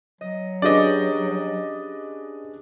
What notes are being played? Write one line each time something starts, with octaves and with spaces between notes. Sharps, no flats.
F#3 D#5
C#4 D4 G4 G#4 B4 D5 D#5 F5